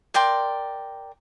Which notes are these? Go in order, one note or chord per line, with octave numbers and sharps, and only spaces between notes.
A#4 D5 G5 C6